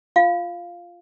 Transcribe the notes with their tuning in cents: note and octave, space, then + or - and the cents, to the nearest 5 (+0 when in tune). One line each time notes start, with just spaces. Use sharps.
F4 +0 F5 +0